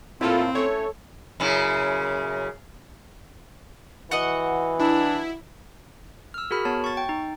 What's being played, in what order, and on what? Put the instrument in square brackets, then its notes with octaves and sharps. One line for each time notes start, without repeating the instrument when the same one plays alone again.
[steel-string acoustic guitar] A2 A#3 [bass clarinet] C4 [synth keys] E4 F4 A4
[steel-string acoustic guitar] A3 C#4 [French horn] A4 [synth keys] C#5
[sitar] F#2 C#3 E4
[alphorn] E3 [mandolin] F#4 D#5 F#5
[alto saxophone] D4 [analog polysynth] E4
[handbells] E6 F6
F#4 G#4 A#4 B5 F6
B3 F#4 C#5 A5
C#6 A6
G5
D#4